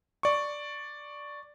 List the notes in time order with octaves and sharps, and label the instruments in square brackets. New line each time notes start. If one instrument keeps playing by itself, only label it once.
[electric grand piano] D5 C#6